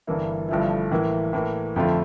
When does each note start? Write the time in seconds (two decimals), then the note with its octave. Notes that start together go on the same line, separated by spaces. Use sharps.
0.07 G1 G2 E3 A#3 E4
0.49 G1 G2 F3 A3 E4
0.91 A2 E3 A#3 E4
1.33 A2 E3 A#3
1.76 F2 D3 A3 C4 F4